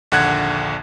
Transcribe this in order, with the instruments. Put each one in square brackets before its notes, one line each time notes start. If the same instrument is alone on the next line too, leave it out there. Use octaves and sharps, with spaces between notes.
[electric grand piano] A#1 D#2 D3 F#5 F#6 G#6